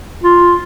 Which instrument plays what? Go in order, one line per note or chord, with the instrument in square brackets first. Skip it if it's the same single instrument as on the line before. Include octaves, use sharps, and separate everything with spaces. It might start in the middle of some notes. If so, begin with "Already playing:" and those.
[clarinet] F4